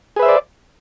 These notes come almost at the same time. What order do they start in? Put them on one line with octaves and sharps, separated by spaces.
G#4 B4 E5 C5 D5